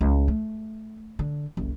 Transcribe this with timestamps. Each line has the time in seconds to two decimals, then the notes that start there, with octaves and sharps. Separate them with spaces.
0.01 C#2
0.28 A3
1.19 D3
1.57 F#1 C2